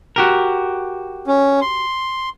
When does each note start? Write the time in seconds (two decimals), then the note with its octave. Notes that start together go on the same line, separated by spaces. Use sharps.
0.16 F#4 G4 A#4
1.27 C#4
1.61 C6